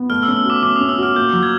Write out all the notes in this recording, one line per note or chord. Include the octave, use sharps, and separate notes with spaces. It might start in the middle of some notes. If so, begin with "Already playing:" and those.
Already playing: B3
A3 F6
E6
C#4
E6
F#4 D6
C#4 D6
C#4 D#6
E6
F#4 F6
A#3 G6
F#3
G#6